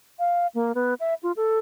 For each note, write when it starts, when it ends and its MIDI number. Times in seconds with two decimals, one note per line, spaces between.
0.19 0.47 77
0.55 0.72 58
0.75 0.94 59
1.00 1.14 76
1.23 1.32 65
1.36 1.59 69